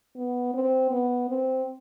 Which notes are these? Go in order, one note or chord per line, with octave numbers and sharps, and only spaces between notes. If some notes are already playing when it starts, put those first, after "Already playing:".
B3
C4
B3
C4